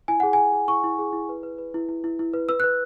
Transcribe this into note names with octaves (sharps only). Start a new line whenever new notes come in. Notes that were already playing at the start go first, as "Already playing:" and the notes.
E4 G#5
G#4 F#5
G#4 G#5
G#4
E4 C#6
E4
G#4
E4
B4
B4
B4
E4
E4
E4
E4
B4
B4 E6
B4 F#6